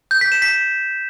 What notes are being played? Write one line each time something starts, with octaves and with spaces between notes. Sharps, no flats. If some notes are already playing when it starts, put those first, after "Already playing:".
G6
B6
E7
B6